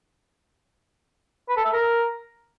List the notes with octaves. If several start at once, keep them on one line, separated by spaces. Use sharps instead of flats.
B4
A4
E5
A#4